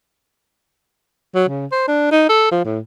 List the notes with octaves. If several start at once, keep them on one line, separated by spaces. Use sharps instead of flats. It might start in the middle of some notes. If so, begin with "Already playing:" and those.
F#3
C#3
C5
D4
D#4
A4
F3
A2